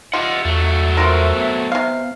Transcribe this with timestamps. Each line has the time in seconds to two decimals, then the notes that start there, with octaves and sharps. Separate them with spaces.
0.14 F4 G4 D#5 E5 F#5
0.45 E2 F#3 A3
0.97 C4 F4 A#4
1.35 B3
1.72 C3 F5